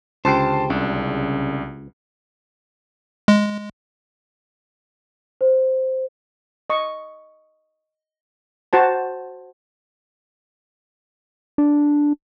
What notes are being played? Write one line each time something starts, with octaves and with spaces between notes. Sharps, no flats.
C#2 D3 G4 C5 A5 C7
C2 C#3 D4
G#3
C5
D#5 C#6
F#4 C5 A5
D4